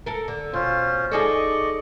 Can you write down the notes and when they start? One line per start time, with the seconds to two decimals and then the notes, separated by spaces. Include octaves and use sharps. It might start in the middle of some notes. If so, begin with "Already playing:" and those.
0.06 A4 A#4
0.28 D3
0.53 B2 C#4 F4 C5
1.12 D#4 G#4 A4 D5 D#5 C#6